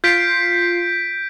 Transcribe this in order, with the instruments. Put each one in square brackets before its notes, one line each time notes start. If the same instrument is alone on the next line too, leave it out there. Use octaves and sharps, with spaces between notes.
[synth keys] F4 C7 [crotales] G6 B6 D7